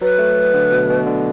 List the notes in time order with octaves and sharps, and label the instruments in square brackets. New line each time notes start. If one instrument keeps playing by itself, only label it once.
[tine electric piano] F#3 [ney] B4
[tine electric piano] A3
D3
B2
B2
D3